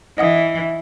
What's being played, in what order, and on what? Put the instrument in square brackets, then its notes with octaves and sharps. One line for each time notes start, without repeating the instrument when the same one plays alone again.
[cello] E3 [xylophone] D#5 F#5 D#6